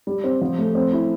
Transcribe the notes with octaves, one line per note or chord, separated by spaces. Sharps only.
G3
C4
F3
A3
C4
E4